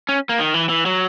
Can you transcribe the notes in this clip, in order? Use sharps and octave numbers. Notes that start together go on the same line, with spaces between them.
C#4
A#3
D#3
E3
E3
F#3